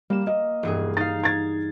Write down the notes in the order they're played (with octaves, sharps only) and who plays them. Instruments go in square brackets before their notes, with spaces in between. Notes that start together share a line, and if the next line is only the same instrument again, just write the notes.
[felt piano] G3 [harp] A#3 E7
[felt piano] D#5
[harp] E1 G2 G#4
[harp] D#4 F5 [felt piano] A6
[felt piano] G#6 A6